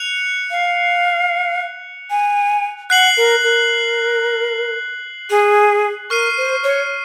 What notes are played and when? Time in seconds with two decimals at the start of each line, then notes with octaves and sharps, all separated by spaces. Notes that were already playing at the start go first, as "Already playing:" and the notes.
Already playing: F#6 C#7 F7
0.51 F5
2.10 G#5
2.90 F#5 F#6 C7 F#7
3.17 A#4
3.43 A#4
5.30 G#4
6.10 A#4 C#6 F6 C7 D#7
6.37 C5
6.63 C#5